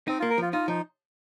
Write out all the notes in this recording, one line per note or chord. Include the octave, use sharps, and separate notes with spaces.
C4 D#4
A#3 F4
A#4
F3 F4
D#4 F4
F3 D#4